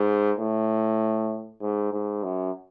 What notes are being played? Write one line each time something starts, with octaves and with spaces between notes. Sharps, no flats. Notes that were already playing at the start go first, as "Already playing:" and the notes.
Already playing: G#2
A2
G#2
G#2
F#2